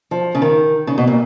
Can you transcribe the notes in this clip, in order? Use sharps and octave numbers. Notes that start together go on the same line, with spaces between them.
F3
C#3
D#3
C#3
B2
A#2